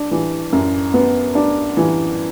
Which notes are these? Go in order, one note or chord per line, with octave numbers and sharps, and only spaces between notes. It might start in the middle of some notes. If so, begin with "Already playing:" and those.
Already playing: D4
E3
F#2
B3
D4
E3